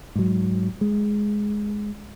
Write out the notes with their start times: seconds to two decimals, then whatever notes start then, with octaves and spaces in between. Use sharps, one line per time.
0.16 G#2 F#3
0.81 G#3